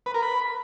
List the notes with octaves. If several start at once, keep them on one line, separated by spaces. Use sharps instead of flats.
B4
A#4
B5